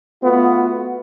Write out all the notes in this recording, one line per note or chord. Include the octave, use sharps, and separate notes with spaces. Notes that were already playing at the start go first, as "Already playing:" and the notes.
A3 B3 F4 F#4